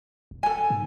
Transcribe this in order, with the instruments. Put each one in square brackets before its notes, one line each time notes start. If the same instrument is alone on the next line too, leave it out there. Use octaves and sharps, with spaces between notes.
[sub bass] D#1
[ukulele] A4 G#5
[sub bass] G#2